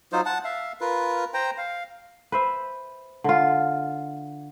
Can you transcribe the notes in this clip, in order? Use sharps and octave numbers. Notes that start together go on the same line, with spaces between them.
F#3 D#4 F4 C5
F#5 A5
E5 F5
F4 A#4 B4
C5 G5 A#5
F5
B4 C5 E5
D3 F4